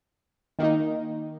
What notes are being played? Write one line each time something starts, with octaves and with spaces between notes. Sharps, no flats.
D#3 A#3 D#4